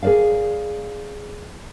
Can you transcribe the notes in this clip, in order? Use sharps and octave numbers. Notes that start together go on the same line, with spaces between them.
G#4 A#4 C5 D5 F5